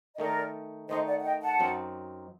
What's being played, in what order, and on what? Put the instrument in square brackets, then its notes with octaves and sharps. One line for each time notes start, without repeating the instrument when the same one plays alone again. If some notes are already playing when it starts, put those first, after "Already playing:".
[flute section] D#5
[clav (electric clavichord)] D#3 A3 D#4 [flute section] A#4 D5
[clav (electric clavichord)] D#3 A3 D#4 [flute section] C5 D#5
[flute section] D5 F#5
F#5
D#5 G5
F#5 A5
[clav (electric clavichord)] F#2 F#3 C4 D#4